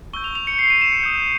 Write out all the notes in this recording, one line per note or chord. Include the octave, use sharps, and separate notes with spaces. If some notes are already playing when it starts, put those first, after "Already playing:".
C#6 E6 G6 G7
F7
F7
C#7
C7
D#7
E7
C#7
D#6 G6